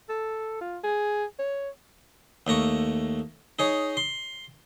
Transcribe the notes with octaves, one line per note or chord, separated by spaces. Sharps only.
A4
F4
G#4
C#5
D#2 A3 A#5 C#6
D#4 G#4 C#5
C6